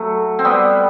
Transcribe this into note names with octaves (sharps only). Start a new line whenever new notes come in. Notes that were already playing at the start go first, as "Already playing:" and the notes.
Already playing: F#3 A3
C4
G3 B3